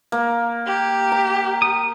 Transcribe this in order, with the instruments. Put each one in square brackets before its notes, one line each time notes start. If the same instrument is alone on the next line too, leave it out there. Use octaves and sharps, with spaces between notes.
[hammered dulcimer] A#3
[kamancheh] G4
[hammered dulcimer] A#5
[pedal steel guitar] D#6